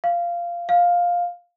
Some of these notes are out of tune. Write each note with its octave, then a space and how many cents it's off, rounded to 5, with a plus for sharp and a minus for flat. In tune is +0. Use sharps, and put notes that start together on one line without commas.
F5 -15
F5 +10